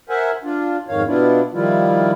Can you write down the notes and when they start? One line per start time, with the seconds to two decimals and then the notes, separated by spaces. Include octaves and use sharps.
0.09 A#4 C5 E5 F#5 G#5
0.44 D4 F4
0.88 F2 G#2 D#3 C#5 F5
1.07 B2 B3 D4 E4 F4
1.54 D#3 F3 G3 E4 F4